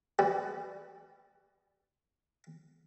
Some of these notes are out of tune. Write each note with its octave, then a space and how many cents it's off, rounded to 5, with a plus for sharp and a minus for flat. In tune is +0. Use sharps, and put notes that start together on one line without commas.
G3 +5 G4 -45 B4 +15